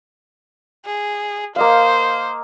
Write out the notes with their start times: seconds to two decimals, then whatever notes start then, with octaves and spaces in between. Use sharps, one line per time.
0.86 G#4
1.56 A#3 C5 D#5 F5